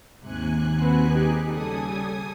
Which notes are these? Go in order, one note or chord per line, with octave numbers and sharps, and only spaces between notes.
D#2 G#2 C3 G#5 F#6
C4 F#4 B4
D#4 G4 G#4
C#3 G3 A4 G#5 D#6